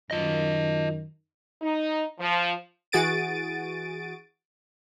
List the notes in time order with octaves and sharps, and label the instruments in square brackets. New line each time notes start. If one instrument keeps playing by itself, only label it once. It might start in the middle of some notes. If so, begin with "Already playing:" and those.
[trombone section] F#2 D#3 [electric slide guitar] F4 D#5
[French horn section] D#4
F3
[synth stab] E3 F#4 G#4 A6 D7 D#7